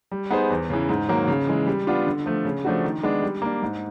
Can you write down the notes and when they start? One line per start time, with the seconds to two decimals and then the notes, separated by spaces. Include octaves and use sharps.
0.12 G3
0.31 B3 D#4 G#4 C5
0.50 E2
0.70 C#3 E3
0.89 G#2
1.09 D#3 F#3 A#3
1.28 C#3
1.47 E3 G#3
1.67 G3
1.87 B3 D4 F4
2.06 D3
2.26 F3 A3
2.45 C#3
2.65 F3 A3 D4 F#4
2.84 D#3
3.03 G#3 B3 D4
3.22 G3
3.42 A#3 D4
3.62 G#2